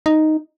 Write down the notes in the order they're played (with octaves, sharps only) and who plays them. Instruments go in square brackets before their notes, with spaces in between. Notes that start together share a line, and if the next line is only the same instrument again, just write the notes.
[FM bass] D#4